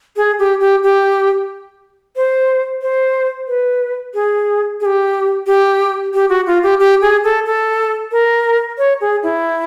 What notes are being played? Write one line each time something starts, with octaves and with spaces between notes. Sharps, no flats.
G#4
G4
G4
G4
C5
C5
B4
G#4
G#4
G4
G4
G4
F#4
F4
G4
G4
G#4
A4
A4
A#4
C#5
G#4
E4